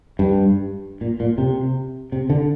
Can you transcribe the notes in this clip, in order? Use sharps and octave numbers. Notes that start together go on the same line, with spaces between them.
G2
A#2
A#2
C3
C3
D3